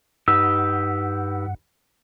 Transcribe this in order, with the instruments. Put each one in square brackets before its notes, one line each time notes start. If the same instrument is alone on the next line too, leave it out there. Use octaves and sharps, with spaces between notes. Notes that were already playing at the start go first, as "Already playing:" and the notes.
[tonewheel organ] G2 F#5 [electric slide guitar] D#4 G4 B4 [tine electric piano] E6